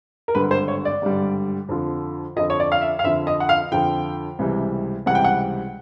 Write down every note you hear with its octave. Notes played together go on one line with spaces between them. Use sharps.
A#4
G#1 G2 D3 G3 B4
C5
C#5
D5
G#1 G2 D3 G3
F2 D3 F3
F2 D3 F3 D#5
C#5
D5
F5
E5
F5
F2 D3 F3 E5
D#5
F#5
F5
F2 D3 F3 G5
C#2 C3 E3 G3
C#2 C3 E3 G3 F#5
G5
F#5